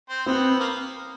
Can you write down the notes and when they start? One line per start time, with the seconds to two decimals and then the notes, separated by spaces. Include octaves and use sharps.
0.09 C4 C5
0.26 B3 C4 B4
0.60 A#3 A#4